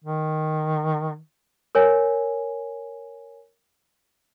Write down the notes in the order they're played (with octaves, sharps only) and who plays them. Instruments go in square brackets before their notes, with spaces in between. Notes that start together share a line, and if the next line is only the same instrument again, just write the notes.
[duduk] D#3
[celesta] A#4 C#5 G#5